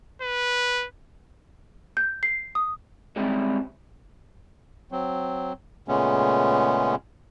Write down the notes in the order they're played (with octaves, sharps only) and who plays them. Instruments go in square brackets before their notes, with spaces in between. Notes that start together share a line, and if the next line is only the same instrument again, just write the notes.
[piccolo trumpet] B4
[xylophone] G6
C7
D#6
[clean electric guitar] G3 G#3 C4 C#4 E4 G4
[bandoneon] F#3 C4
A#2 C#3 G#3 A3 B3 C#4